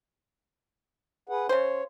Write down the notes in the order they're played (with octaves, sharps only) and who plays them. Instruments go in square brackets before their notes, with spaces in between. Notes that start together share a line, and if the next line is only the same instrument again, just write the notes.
[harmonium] G#4 B4 F#5
[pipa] C#3 C5 [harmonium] C#5